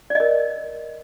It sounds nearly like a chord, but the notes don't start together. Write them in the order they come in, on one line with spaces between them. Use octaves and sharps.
D5 D#5 A#4